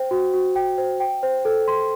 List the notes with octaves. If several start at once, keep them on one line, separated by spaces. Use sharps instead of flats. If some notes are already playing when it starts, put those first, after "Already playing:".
Already playing: C5 G5
F#4
F#4
G5
C5
G5
C5
A4
C6